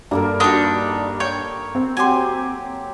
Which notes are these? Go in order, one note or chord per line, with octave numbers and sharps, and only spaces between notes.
G2 A#3 A4 A#4
D4 D#4 F#4 G4 C6
C#5 G5
C4
F#3 G4 G#5 C6